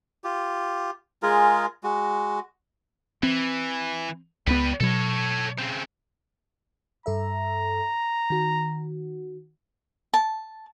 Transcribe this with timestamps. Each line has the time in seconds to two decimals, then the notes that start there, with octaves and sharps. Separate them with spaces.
0.24 F4 G4
1.23 G#3 F4 G#4 A#4
1.83 G#3 F#4
3.23 E3 C4
4.47 C#2 G3 B3 B4
4.80 B2 F#3 A4 C#5
5.58 C#3 C4
7.06 G2 A4 E5 A#5
8.30 D#3 F#4
10.14 A5